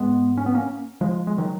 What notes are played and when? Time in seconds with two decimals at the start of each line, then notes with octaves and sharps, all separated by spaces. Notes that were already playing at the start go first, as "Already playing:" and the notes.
Already playing: G#2 G#3 B3
0.37 C#4
0.46 B3
0.54 A#3 C#4
1.01 F3 G#3
1.27 G#3
1.38 D#3 F#3